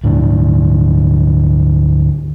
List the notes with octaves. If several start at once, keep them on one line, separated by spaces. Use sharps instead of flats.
D2 G#2 D4